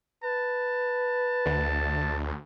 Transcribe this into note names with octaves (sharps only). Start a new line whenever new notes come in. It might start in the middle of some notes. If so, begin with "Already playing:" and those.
B4 A5
D2